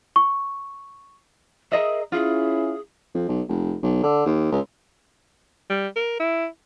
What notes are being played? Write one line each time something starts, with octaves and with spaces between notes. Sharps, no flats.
C#6
G#4 A#4 D#5 E5
C#4 E4 F4 G#4
F2
B1
F1
B1
D3
D#2
C#2
G3
A#4
E4